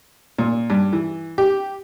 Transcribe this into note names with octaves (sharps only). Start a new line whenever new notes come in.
A#2
G2
E3
G4